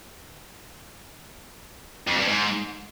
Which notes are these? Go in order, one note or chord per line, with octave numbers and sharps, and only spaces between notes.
F2
G2
G#2